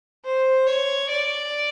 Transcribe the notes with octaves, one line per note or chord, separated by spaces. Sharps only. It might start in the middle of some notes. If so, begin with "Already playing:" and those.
C5
C#5
D5